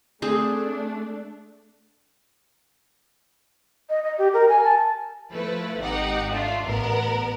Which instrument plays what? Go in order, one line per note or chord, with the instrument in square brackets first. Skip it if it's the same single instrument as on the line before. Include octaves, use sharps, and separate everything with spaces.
[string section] A3 D4 [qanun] C4 G#4
[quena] D#5
D#5
G4
A#4
G#5
A5
[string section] F3 A3 E4 B4
G#1 D#4 G4 F#5
A3 D4 F4
A1 B3 A#4